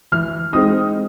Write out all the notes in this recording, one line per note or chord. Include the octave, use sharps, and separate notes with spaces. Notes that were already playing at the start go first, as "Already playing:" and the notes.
E3 F6
G#3 C4 D#4 D#6